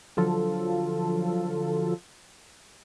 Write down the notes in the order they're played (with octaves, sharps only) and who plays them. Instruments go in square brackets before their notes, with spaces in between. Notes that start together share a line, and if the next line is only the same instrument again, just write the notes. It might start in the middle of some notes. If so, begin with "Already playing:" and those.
[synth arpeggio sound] D3 F3 F#3 F4 A4